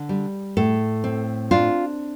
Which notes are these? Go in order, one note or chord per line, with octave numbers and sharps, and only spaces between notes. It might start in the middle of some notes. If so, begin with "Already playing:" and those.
Already playing: D3
G3
A2 A4
C4
D4 F4